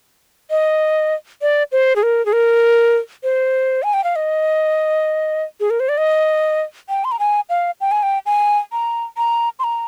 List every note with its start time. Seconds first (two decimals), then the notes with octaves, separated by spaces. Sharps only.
0.51 D#5
1.42 D5
1.72 C5
1.96 G#4
2.03 A#4
2.26 G#4
2.33 A#4
3.23 C5
3.83 G#5
3.94 G5
4.04 F5
4.16 D#5
5.60 G#4
5.70 A#4
5.80 C5
5.89 D5
5.98 D#5
6.89 G5
7.05 C6
7.12 A#5
7.19 G#5
7.50 F5
7.81 G5
7.91 G#5
8.03 G5
8.26 G#5
8.72 A#5
9.17 A#5
9.59 C6
9.64 A#5